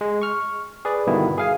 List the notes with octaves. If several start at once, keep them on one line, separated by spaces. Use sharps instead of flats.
G#3
C#6 F6
G#4 B4 D5
G2 B2 D3 D#3 E4
G#4 F5 G#5